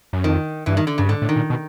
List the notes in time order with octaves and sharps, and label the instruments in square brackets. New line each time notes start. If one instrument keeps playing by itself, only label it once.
[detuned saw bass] F#2
[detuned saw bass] F2 [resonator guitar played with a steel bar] D#3
[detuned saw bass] G2 [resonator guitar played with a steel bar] E3
[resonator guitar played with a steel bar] D#3
D3
[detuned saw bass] G2 [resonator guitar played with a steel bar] C#3
[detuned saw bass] G#2 [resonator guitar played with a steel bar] D3
[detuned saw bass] A2
[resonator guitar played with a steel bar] D#3
[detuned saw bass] A#2
B2